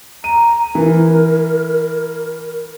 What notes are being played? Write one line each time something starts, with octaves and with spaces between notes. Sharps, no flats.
A#5 D#7
E3 A#4